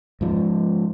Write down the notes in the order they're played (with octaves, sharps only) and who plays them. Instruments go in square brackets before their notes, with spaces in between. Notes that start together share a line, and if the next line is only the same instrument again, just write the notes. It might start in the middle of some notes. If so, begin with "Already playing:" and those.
[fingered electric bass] G#2 F3